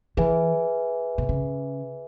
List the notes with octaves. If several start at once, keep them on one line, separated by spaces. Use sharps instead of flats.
E3 G#4 B4 E5 G#5
B2
C#3